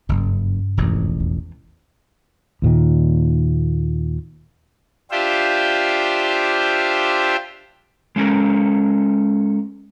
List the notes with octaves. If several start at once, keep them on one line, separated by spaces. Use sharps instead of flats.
F#1 G2 C#3
E1 A1 F2
E2
D#2 A#2 D#3
D4 F4 G4 C5 E5
G#3 C#4 A4 A#4